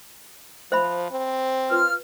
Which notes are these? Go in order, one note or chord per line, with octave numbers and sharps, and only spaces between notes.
F3 C5 E5 B5
C4
F4 B4 F6